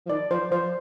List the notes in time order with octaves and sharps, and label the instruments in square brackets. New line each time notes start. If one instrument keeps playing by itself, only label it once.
[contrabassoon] F3
[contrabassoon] D#3 [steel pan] D5
[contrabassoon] F3 [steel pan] C5
[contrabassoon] F3 [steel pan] C5